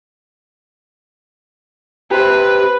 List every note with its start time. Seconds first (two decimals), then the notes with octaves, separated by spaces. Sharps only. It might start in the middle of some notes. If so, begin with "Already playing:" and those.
2.11 G4 B4 C5